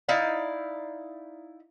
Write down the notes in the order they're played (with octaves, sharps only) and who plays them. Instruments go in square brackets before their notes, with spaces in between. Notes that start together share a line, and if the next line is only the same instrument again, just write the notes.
[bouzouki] D#4 E4 D5 F5